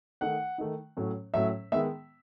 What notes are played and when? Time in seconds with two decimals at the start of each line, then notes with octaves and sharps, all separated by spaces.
0.21 D#3 A3 D#4 F#5
0.58 D#3 A3 D#4
0.97 A2 F#3 A3 C#4
1.34 A2 F#3 A3 C#4 E5
1.72 D#3 G#3 B3 E5